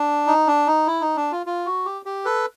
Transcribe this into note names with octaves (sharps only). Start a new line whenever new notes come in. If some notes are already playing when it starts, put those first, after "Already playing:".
Already playing: D4
D#4
D4
D#4
E4
D#4
D4
F4
F4
F#4
G4
G4
A4 B4